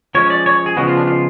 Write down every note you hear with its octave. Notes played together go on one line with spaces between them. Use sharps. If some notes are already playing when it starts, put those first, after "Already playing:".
F3 G#3 C#4 C#5
D5
C#5
G#4
C#3 F3 G#3 B3 F#4
F4
D4
F4